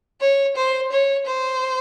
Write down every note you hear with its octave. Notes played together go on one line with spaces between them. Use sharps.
C#5
C5
C#5
C5